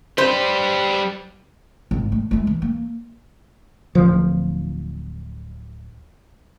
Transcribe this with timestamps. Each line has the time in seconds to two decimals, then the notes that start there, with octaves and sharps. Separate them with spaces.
0.18 G3 B4 C5
1.91 G#1 G#2
2.12 A3
2.31 G#3 A3
2.47 E3
2.62 A#3
3.95 D1 F3